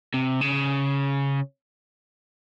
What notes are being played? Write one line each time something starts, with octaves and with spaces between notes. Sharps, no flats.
C3
C#3